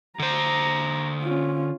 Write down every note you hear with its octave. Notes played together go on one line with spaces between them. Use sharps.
D3 C5 A#5
C#4 F4